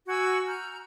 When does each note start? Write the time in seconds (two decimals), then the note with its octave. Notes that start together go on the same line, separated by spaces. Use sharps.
0.08 F#4 G#5 E6 G#6
0.47 A#5 F6 G6